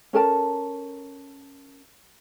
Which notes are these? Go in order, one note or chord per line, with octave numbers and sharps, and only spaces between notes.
C#4 A4 A#4 A5